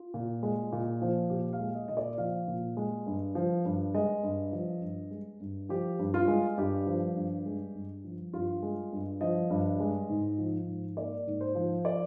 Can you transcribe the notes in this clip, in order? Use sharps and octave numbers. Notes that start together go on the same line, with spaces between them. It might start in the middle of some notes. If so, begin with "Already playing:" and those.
Already playing: F4
A#2
G#3
A#2
F3
A#2 G4
F5
G#3
D#5
A#2 D#5
D5
F3 F5
A#2
G#3
G2
F3
G2
G#3 D#5
G2
F3
G2
G#3
G2
F3 G4
G2
F4
G#3
G2 G4
F3
G2
G#3
G2
F3
G2 F4
G#3
G2
F3 D#5
G2
G#3
G#2
F3
G#2
A#3 D5
G#2
C5
F3
D5